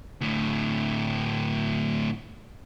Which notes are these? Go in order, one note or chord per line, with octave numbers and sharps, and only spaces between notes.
D2 A2